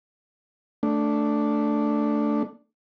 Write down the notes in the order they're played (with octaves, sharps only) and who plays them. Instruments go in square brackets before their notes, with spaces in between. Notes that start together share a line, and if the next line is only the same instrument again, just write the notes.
[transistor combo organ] A3 D4